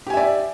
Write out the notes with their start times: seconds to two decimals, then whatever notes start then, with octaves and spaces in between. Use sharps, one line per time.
0.07 G4
0.10 G#5
0.14 E5
0.17 D5